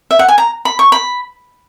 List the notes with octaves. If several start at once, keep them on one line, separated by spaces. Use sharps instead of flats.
E5
F#5
G#5
A#5
B5
C#6
B5